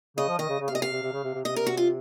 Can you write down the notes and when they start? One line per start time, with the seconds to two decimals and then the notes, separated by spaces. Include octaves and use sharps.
0.17 C#3 D#5
0.28 F3
0.38 D#3 D#5
0.49 C#3
0.60 C#3
0.68 F5
0.70 C3
0.75 D#5
0.81 C3 F5
0.92 C3
1.02 C3
1.13 C#3
1.24 C3
1.35 C3
1.45 C3 D#5
1.56 A#4
1.67 F#4
1.77 F4